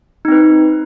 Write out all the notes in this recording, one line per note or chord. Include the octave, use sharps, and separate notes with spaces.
C4 D#4 B4